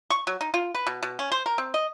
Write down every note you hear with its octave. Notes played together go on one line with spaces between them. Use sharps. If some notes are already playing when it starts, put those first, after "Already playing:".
C#6
F#3
D#4
F4
B4
B2
B2
C#4
C5
A#4
C4
D#5